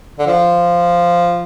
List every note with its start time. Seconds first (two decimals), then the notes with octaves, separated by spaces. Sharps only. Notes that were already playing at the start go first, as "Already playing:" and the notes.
0.19 D3
0.27 F3